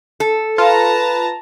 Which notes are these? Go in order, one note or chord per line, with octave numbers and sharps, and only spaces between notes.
A4
F4 B4 A5 A#5